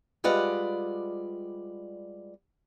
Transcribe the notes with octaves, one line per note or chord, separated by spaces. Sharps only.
G3 G#3 F4 B4 D5 F#5